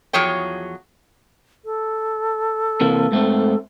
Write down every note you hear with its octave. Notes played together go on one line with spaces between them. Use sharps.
E2 F3 F#3 G#4 C#5 G5
A4
C3 E3 A#3
G#2 A3 C4